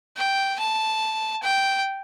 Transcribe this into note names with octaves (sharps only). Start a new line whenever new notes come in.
G5
A5
G5